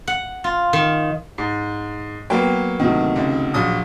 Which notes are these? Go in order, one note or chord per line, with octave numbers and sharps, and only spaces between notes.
F#5
F4
D#3
G#2
F#3 A#3 B3 G5
D2 C3 D#3
C#2
A#1 F#3 D#6